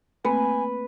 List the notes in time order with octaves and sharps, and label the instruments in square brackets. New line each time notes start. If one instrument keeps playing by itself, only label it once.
[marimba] A3 A#3 C4 [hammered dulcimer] B4 [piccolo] G#5